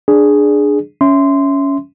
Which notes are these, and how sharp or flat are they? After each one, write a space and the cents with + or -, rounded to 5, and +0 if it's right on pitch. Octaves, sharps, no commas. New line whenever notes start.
D4 +10 G#4 +0 D5 +0
C#4 +10 E5 +0 C6 -15